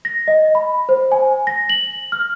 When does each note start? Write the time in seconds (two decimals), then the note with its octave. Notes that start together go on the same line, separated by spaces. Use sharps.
0.05 A#6
0.28 D#5
0.55 B5
0.89 C5
1.12 G#5
1.47 A#6
1.69 F#7
2.12 F6